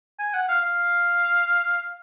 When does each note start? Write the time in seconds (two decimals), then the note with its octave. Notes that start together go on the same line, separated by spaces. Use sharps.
0.19 G#5
0.34 F#5
0.48 F5
0.62 F5